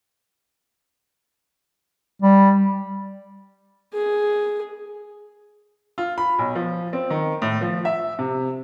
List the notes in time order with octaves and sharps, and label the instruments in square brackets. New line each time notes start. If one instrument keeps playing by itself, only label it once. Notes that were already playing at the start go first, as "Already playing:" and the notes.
[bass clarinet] G3
[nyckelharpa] G#4
[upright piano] F4
B5
B1
F3
C4
D#3
A2
F3
E5
C3